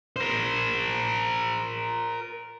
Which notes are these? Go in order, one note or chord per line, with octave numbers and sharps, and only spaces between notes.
A#4 C5